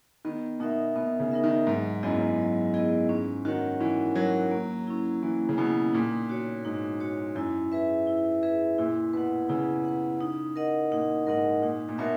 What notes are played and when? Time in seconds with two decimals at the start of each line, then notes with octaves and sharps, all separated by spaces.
0.25 D#3 B3
0.60 B2 D#4 A#4 E5
0.95 B2 B3
1.20 C#3
1.32 D#4 A#4 E5
1.44 D#3
1.67 G#2 F#3
2.03 F#2 B3 E4 G#4 D#5
2.19 F#2
2.38 F#3
2.74 B3 E4 G#4 D#5
3.09 G#2 C#4
3.45 D#3 F#4 A#4 C#5 F#5
3.80 E3 C#4
4.15 F#3 F#4 A#4 C#5 F#5
4.51 A#3
4.87 C#4 E4
5.23 E3 A#3
5.49 C#3
5.58 B2 C#4 E4
5.94 A#2 D#4
6.29 F#4 C#5
6.65 G#2 D#4
7.00 F#4 C#5
7.35 F#2 E4
7.72 G#4 B4 E5
8.07 E4
8.43 G#4 B4 E5
8.78 A#2 E4
9.13 B2 B4 F#5
9.49 C#3 E4
9.85 B4 F#5
10.21 D#4
10.56 A#4 D#5 F#5
10.92 A#2 D#4
11.27 G#2 A#4 D#5 F#5
11.62 A#2 D#4
11.89 A#2
11.98 B2 A#4 C#5 E5